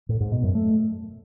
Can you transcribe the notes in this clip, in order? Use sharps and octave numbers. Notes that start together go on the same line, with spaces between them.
A2
G#2
B2
F#2
A3